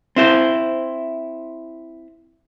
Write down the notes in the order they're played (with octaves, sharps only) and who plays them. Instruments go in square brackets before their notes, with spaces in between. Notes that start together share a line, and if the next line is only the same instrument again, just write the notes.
[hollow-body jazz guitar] C4 E4 C5